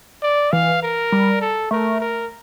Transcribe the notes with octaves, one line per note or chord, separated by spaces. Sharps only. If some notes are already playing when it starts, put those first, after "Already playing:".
D5
E3 F5
A#4
G3
A4
A3 A#4
A#4